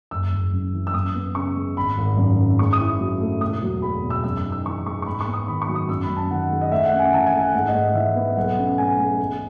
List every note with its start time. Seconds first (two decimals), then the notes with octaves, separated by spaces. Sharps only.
0.11 F#1 E6
0.33 F#1
0.53 F#2
0.74 E3
0.87 E6
0.94 F#2 D#6
1.15 B3
1.35 C#3 C#6
1.55 G#3
1.76 G#1 B5
1.98 G#1
2.17 F#2
2.39 C#3
2.59 G#2 C#6
2.73 D#6
2.80 E4
3.00 F#3
3.20 A3
3.41 E1 D#6
3.62 F#3
3.82 E2 B5
4.03 B2
4.10 E6
4.24 F#2 E6
4.37 E6
4.45 D#4
4.52 E6
4.66 E3 C#6
4.85 G#3 C#6
5.02 C#6
5.06 G#2 B5
5.21 C#6
5.27 B3
5.34 D#6
5.47 D#3 B5
5.62 C#6
5.68 F#3
5.75 D#6
5.89 F#2 E6
6.03 B5
6.09 F#2
6.17 A5
6.31 D#3 F#5
6.51 G#3
6.61 D#5
6.71 A2 E5
6.85 F#5
6.93 C#4
6.99 G#5
7.13 E3 A5
7.27 G#5
7.33 A3
7.41 F#5
7.54 G#2 F#5
7.68 D#5
7.74 G#2
7.95 E3 E5
8.15 B3
8.37 B1 F#5
8.58 C#4
8.78 A2 G#5
8.99 G#3
9.20 E2